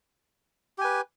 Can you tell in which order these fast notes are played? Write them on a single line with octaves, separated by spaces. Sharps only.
G4 G#5 B4